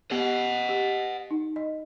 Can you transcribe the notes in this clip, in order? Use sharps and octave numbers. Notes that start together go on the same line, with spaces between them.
B3 G4 D#5 F#5
G4
D#4
D#5